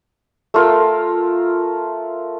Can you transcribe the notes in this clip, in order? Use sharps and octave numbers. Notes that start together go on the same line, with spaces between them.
A3 F4 A#4